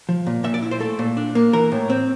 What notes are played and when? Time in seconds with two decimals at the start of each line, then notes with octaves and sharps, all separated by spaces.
0.09 F3
0.27 A#2
0.44 A#2 E5
0.54 D5
0.62 E4
0.71 C5
0.80 A3 A4
0.99 A#2
1.17 D4
1.35 A#3
1.53 E3 A#4
1.72 A2
1.90 C4